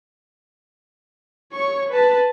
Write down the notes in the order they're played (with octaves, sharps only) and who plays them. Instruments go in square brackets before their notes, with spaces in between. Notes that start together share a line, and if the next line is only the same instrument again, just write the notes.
[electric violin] C#5 C#6
B4 A5